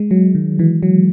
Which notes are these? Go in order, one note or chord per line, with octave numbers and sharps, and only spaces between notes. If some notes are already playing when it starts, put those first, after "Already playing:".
Already playing: G#3
F#3
D#3
E3
F#3